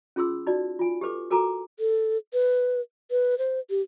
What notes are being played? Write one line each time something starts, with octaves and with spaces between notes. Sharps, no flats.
C#4 F4 G#4 C6 E6
D#4 F#4 D5
F4 G#5
G4 A4 B4 D6
F#4 A4 A#4 G#5 A#5 D6
A4
B4
B4
C5
G4